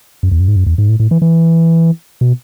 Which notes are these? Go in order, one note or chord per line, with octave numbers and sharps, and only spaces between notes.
F#2
E2
F#2
G#2
F#2
E2
G#2
A2
A2
E3
E3
B2